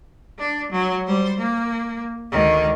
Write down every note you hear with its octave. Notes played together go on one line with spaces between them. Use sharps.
D4
F#3
G3 C5
A#3
D2 D#3